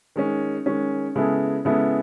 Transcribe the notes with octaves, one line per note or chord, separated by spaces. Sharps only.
D#3 G#3 C#4
D#3 G#3 C#4
C#3 G#3 B3 E4 A4
C#3 G#3 B3 E4 A4